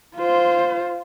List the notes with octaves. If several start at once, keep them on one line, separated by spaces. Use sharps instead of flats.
F4 C5